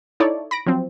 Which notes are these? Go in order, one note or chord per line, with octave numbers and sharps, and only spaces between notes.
D#4 E4 A4 C#5 D5
B5 A#6 D7
F3 F#3 C4